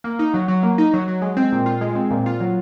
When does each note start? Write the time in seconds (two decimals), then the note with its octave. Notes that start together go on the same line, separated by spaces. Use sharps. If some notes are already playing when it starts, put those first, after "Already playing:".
0.04 A#3
0.19 D#4
0.34 F#3
0.48 F#3
0.63 A#3
0.78 D#4
0.93 F#3
1.08 F#3
1.22 G#3
1.37 C4
1.52 A#2
1.66 F4
1.81 G#3
1.95 C4
2.11 A#2
2.26 F4
2.40 F#3